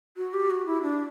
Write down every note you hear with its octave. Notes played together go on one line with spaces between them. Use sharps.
F#4
G4
F#4
E4
D4